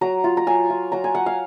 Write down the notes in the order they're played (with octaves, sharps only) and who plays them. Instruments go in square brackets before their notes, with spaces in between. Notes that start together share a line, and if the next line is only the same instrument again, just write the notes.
[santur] F#3 A#5
F4
A#5
F#3 G#5
F4
F#3 A#5
G#5
F#3 F#5
F5